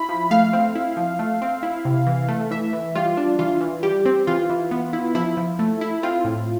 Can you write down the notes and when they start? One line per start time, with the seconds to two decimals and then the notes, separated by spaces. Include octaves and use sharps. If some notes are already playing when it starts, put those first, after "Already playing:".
Already playing: E4 B5
0.09 F3
0.31 A3 F5
0.53 C4
0.75 E4
0.97 F3
1.19 A3
1.42 C4
1.63 E4
1.85 C3
2.07 E3
2.28 A3
2.51 E3 E5
2.73 E3
2.95 G3 F4
3.17 D4
3.39 E3 F4
3.61 E3
3.83 G3 G4
4.05 C4
4.27 E3 F4
4.50 E3
4.71 B3
4.93 E4
5.15 F3 E4
5.37 F3
5.59 A3
5.81 E4
6.03 C4 F4
6.25 A2